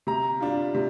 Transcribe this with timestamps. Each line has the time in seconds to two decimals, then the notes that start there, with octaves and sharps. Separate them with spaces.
0.07 C3 A#5
0.40 G3 D4 F4
0.75 C3